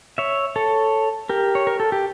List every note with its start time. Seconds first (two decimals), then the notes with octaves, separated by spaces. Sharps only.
0.18 C#5 E5
0.56 A4 C#5
1.29 G4 A#4
1.55 C#5
1.67 A#4
1.80 A4
1.92 G4